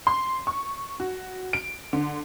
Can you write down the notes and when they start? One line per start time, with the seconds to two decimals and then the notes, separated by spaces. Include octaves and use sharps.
0.07 C6
0.47 C#6
1.00 F#4
1.53 D7
1.93 D3